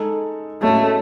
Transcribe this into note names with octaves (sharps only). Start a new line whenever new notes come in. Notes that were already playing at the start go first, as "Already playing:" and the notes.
Already playing: G#3 D#4 A4
A2 G#3 A3 C#4 F#4 C#5